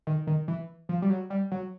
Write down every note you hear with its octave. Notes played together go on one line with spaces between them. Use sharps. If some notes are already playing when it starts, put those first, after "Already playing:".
D#3
D#3
E3
F3
G3
F#3
G3
F#3